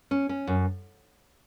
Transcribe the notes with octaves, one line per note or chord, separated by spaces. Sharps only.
C#4
C#4
F#2